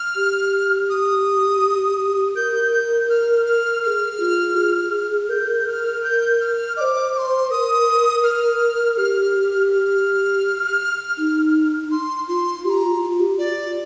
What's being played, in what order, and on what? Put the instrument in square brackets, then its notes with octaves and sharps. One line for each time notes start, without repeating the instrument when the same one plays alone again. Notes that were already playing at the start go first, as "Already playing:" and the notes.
Already playing: [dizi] F6
[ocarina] G4
[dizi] D#6
[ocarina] A#4 [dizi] G6
[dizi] G6
F6
F6
[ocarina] G#4 A#4 [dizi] F6
[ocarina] F4
G#4
[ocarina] A#4 [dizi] G6
[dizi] F6
G6
F6
[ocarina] C5 D#5 [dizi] D6
[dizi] D6
C6
[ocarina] A#4 [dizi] D#6
[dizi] F6
[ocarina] G4 [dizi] F6
[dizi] F6
[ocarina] D#4
[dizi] C6
[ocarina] F4 [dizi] C6
[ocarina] G4 [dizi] C6
[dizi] A#5
[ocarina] F4
F4
G4
[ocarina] F4 [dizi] D5